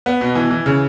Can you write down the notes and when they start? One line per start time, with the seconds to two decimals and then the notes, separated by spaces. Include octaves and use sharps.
0.06 B3
0.21 B2
0.35 E3
0.51 E3
0.66 C#3